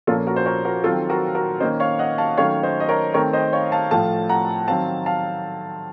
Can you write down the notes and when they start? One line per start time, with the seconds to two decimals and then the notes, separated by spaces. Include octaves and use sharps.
0.07 A#2 F3 A#3 C#4 F4 A4
0.27 F#4 A#4
0.36 C5
0.46 A#4 C#5
0.65 F#4 A#4
0.84 D#3 F#3 C4 F4 A4
1.09 F#4 A#4
1.35 F#4 A#4
1.60 D#3 A#3 C#4 C5 D#5
1.80 C#5 F5
1.99 D#5 F#5
2.18 F5 A5
2.37 D#3 F#3 A3 C#4 C#5 F5
2.63 C5 D#5
2.80 D#5
2.89 A#4 C#5
3.14 D#3 A3 C4 A#4 C#5
3.33 C5 D#5
3.53 C#5 F5
3.72 F5 A5
3.91 A2 F3 A3 F5 A5
4.29 F#5 A#5
4.68 D#3 F#3 C4 F5 A5
5.06 F5 A5